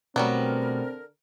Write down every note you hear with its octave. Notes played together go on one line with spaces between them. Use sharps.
B2 D3 F#3 G3 A3 B3 C4 A#4